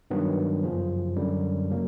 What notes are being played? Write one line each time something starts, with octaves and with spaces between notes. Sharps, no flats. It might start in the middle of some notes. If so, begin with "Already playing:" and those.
G2 D#3 F#3 B3
F#2 C#3 F3
F#2 D3 G3
C#3 F#3 A#3